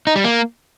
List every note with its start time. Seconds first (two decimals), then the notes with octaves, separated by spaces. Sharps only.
0.07 D#4
0.16 G3
0.24 A#3